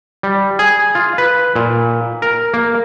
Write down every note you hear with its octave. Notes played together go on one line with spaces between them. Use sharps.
G3
G#4
F4
B4
A#2
A#4
A#3